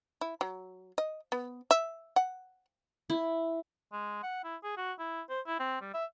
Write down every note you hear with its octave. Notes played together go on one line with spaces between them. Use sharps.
E4
F#3
D#5
B3
E5
F#5
E4
G#3
F#5
E4
G#4
F#4
E4
C5
E4
C4
G3
E5